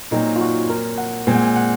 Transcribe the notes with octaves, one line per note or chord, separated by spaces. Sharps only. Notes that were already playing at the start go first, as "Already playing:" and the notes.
A#2 F#3 C4 D#4
F4
F#4
A#4
F#5
A#2 G#3 C4 G#5
F#5
G#5
F#5